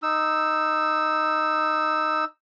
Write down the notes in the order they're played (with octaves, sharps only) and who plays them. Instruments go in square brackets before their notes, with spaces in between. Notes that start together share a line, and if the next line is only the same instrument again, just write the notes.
[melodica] D#4 E6